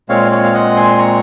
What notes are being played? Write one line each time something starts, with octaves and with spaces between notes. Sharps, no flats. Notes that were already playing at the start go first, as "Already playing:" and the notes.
A#2 G#3 C4 C#5 F5
C#5 F5
F5
D#5 F#5
G#5 C6
A#5 C#6